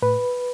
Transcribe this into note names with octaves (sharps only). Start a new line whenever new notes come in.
A2 B4